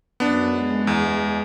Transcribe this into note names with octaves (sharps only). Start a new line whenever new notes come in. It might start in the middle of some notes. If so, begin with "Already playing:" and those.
F#2 B3 D4
G#3
E2